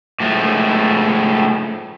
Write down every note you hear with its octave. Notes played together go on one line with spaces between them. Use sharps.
A2 F3 G#3 A3